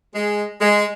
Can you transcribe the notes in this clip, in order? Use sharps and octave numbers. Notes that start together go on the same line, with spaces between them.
G#3
G#3